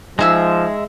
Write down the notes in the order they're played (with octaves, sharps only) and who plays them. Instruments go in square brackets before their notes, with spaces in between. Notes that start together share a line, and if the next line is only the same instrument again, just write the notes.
[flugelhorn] F3 [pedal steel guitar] G#3 E5 [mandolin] D#4 G#4 E6